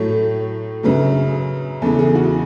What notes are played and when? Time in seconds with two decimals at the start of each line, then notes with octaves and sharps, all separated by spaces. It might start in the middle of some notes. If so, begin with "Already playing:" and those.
Already playing: A2 F#3 A3 C#5
0.83 F#2 C#3 F#3 B4
1.82 E2 C#3 E3 G#3 A4
1.99 G#4
2.15 F#4